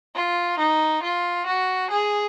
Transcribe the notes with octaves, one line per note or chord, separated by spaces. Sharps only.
F4
D#4
F4
F#4
G#4